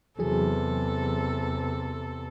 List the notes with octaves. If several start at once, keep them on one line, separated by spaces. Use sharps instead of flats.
E2 C3 E3 F#3 G#4 A4